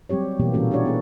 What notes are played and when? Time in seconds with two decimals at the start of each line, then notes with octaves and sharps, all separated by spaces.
0.09 F#3 G3 C4 G4 C#5
0.39 B2 E3 A#3 B3 G4
0.54 A#2 E3 A#3 C#4 F#4 A4
0.71 D4 E4 F#4 G4 C#5 D5
0.85 B3 G#4 A4